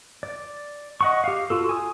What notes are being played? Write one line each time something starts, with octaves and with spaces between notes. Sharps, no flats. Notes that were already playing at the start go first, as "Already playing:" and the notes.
D5
D#5 F#5 C#6
G4 F5
F4 F#4 A4
G#5 D#6